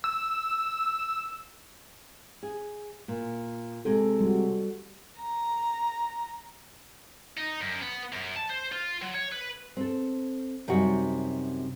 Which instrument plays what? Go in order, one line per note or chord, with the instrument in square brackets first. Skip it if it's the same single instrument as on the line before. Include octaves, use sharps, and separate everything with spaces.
[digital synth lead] E6
[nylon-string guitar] G#4
A#2
[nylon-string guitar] C3 G#3 [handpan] A4
[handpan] G3 F#4
[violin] A#5
[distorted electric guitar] D#4
F#2
B3
F#2
A5
C5
F4
F#3
C#5
B4
[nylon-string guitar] C4 A4
F#2 C3 G3 D#4 F#4